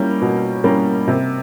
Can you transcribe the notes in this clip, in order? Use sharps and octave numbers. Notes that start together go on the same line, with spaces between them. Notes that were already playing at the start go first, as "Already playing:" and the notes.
Already playing: G3 A#3 C#4 E4
B2
G3 A#3 C#4 E4
C3